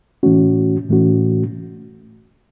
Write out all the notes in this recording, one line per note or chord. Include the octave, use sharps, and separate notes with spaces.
A2 E3 A3 C#4 F#4
A2 E3 A3 C#4 F#4